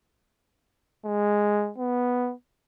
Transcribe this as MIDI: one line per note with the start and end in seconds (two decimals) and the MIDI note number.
1.05 1.71 56
1.78 2.33 59